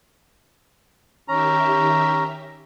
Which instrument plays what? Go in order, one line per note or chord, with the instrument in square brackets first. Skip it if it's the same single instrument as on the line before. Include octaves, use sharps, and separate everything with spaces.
[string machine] D#3 G4 E5 [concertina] C#4 A#5